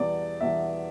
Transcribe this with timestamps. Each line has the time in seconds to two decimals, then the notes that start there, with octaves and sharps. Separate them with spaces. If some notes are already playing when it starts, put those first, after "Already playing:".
Already playing: E2 B2 G3 D5
0.41 E2 B2 G3 E5